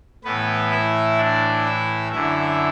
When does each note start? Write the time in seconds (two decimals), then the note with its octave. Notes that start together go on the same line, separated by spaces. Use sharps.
0.24 A2 E3 B3 B4
0.71 E4 E5
1.18 D4 D5
1.65 E4 E5
2.12 F#2 D3 E4 E5